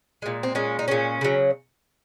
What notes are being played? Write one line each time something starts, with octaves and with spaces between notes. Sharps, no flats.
A#2 G#3
C4
A#2 G#3 C#4
D#4
A#2 G#3 C#4
C#3 F#3